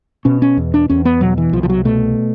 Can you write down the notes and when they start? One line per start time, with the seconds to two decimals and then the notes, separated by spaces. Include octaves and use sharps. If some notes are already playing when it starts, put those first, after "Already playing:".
0.25 B2 C#4
0.42 C#4
0.57 E2
0.74 D4
0.89 E2 C#4
1.05 B3
1.21 B2 F#3
1.38 E3
1.53 C2 F3
1.63 F3
1.70 F#3
1.85 B2 A3